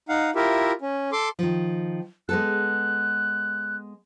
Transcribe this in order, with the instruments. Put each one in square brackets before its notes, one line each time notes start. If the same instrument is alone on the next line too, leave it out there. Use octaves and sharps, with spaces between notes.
[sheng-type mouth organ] D#4 F5 F#5
E4 F4 G4 A#4 E5
C#4
A4 C6 D6
[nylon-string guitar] D#3 F3
[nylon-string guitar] G#3 B3 A4 [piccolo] F#6